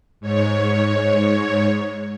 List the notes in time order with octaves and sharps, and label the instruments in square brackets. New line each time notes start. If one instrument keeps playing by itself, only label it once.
[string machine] G#2 C#5